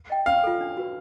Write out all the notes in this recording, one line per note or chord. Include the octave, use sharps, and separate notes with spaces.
D#5 G5
C#4 F5
F4 A4
D4
F#4 B4